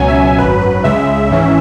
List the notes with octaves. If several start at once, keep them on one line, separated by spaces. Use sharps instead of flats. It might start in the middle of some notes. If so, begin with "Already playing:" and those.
Already playing: C#2 B2 F#3 C#4 G#5
E5
G#1 F#2 F#3 B4
B4
C#2 C#3 G#3 E5
G#1 G#2 E3 C#4